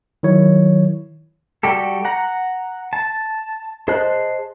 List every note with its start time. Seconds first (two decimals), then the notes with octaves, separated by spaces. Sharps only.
0.23 D#3 F#3 E4 C#5
1.63 G3 F#4 G4 A4
2.05 F#5 A#5
2.93 A5
3.88 G#4 C5 D#5 A5 F#6